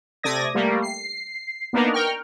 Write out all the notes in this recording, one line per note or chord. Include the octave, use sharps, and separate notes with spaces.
C3 A3 D5 D#6 G#6 A#6
G3 A3 A#3
C7
A#3 B3 D4 D#4 A#4
A#4 G5 C#6 F6